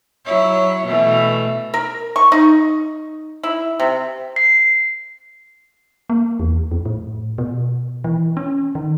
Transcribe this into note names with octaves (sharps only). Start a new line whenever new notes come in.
F#3 E4 C#5
B2 E3 A3
A#4
C#6
D#4
E4
C3
C7
A#3
E2
F2
A2
B2
E3
C#4
D#3